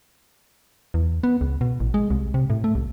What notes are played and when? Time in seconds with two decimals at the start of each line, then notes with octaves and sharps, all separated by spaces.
0.94 E2
1.23 B3
1.41 C#2
1.61 B2
1.80 A1
1.94 G#3
2.10 C2
2.34 C3
2.50 A2
2.64 A3
2.75 C2